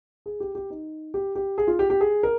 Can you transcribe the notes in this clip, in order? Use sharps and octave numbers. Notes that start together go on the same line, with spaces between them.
G#4
G4
G4
D#4
G4
G4
G#4
F4
G4
G4
G#4
A#4